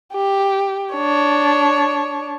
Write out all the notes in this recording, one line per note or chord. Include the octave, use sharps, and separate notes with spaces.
G4
D4 C#5